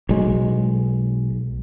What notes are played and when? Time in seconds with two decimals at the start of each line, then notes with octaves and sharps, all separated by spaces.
0.09 B1 G#3